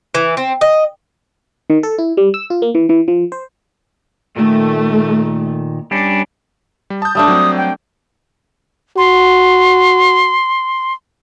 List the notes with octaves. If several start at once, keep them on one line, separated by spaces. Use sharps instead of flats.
E3
C4
D#5
D#3
A4
E4
G3
E6
F4
A#3
E3
E3
F3
C5
A#2 D#3 A3
G3 C#4 D4
G3
A5 D#6 G6
G3 A3 D4 D#6
F#3 C4
G5
F#4 C6